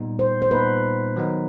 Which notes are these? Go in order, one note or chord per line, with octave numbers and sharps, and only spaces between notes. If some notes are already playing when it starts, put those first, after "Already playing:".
Already playing: A#2 G3 B3 D#4
C5
C5
A#2 G3 B3 D#4 B4
D#3 F#3 B3 D#4